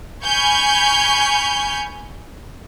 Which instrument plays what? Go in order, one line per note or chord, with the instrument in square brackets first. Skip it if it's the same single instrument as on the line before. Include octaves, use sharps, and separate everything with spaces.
[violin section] G#5 B5 C#6 F6 G6 G#6